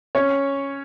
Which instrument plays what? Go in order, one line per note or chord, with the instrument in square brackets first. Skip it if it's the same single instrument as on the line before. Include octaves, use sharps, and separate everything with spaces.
[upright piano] C#4 C#5